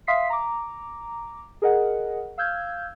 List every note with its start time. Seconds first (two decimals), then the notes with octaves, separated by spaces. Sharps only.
0.07 E5 F5 C6 D#6 B6 C7
0.30 A#5 D6
1.62 G#4 A#4 D#5 F#5
2.38 F5 E6 F6 G6 G#6